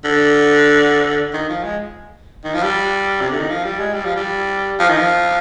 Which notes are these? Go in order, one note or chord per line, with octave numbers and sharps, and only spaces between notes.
D3
D#3
F3
G#3
D#3
F3
G3
C3
D3
D#3
F3
G3
G#3
G3
F3
G3
F3
D#3
F3